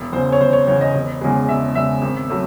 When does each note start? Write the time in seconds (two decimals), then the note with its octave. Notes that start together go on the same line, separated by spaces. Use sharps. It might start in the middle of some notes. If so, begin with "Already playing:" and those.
Already playing: E1
0.13 E2 C5
0.16 C#3
0.32 C#5
0.41 E1 C5
0.53 C#5
0.67 E2 C#5
0.71 C#3
0.81 D#5
0.95 E1
1.21 E2 C#3 G#3
1.48 E1 E5
1.75 E2 C#3 G#3 E5
2.02 G#1
2.30 F#3 A3